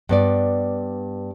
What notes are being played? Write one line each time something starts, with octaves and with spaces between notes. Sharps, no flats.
G2 B3 D5